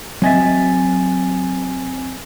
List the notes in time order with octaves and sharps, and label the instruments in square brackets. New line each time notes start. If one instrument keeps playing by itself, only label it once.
[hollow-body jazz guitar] F#3 D#5 E5 [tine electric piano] C4 G#5 A6